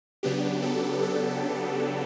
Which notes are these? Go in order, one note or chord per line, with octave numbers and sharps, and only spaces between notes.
C#3 F#3 B3 D4 G4
A4
A4